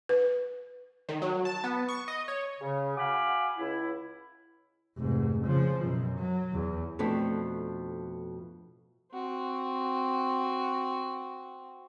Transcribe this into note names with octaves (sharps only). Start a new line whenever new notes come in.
B4
D#3
F#3
A5
B3
C#6
D#5
C#5
C#3
F#4 F5 F#5 G#5 B5 D6
C#2 E4
F1 G#2
C#3 F3
F#2 B2
F#3
E2
F2 B2 A3 D4
C4 F#4